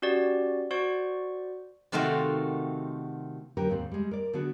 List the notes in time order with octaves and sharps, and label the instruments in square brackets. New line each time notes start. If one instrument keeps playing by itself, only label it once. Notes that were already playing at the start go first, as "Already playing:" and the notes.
[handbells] C#4 F#4 G4 D5
F#4 C5 D5 C#6
[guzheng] C3 D#3 A3 C4 F4 F#4
[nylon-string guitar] D3 F#3 G4 A#4 B4 G5
D#2 G#2 C4 C5 D5
G3 G#3
A#4 D5
D3 B3 D4 F#4 G#4 B4